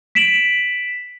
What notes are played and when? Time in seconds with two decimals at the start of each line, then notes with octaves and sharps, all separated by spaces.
0.15 B6 D7 E7 F#7